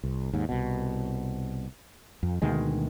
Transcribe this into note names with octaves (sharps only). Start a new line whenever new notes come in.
C2
D#2 G#2
C2 B2
F2
D2 B2 D#3 G#3